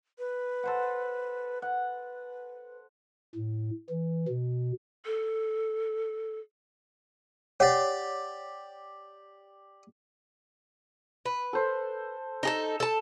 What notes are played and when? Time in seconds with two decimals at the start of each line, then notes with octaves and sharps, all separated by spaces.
0.19 B4
0.63 A4 C5 F#5
1.62 B4 F#5
3.35 A2
3.90 E3
4.28 B2
5.05 A4
7.60 G4 C#5 D5 F#5
11.25 B4
11.53 A4 C5
12.43 D#4 G#4 A4
12.80 A4 A5